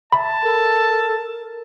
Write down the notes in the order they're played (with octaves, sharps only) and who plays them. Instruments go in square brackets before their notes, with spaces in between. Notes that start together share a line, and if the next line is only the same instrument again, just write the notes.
[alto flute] E5 [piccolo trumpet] A5 [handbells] B5
[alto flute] A4 [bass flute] A#4